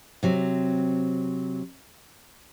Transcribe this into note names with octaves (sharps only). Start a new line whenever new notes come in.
C3 F#3 C4